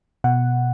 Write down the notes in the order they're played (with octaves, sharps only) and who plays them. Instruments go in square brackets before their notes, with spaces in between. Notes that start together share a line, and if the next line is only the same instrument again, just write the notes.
[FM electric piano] B2 F#5